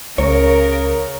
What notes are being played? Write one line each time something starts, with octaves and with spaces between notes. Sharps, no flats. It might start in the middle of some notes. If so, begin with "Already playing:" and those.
C#2 C#3 A#4 C#5